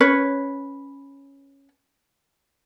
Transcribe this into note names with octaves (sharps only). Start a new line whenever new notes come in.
C#4 B4 C#5